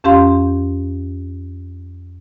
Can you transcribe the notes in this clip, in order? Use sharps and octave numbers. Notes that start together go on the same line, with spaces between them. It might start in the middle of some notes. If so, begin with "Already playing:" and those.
F2 C#4 G4 F5 C6 G6